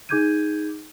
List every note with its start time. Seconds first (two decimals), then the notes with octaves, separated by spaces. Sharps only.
0.09 D#4 G#4 D6 G6 G#6 D#7